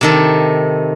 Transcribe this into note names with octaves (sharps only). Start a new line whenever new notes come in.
C3 D#3 A4